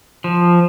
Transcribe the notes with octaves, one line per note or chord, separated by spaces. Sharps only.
F3